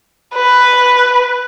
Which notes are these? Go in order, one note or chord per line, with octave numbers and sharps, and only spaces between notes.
B4